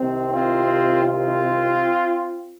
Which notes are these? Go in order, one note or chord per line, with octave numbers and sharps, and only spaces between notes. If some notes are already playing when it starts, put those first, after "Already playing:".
Already playing: C2 C3 D#3 C4
C4 F4
C4 F4